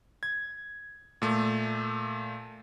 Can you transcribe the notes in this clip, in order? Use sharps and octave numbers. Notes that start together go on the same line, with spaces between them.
G#6
A#2 A3